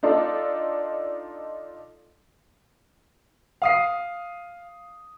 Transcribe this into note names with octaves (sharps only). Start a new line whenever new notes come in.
D4 D#4 F4 A4 D5
F5 D#6 C7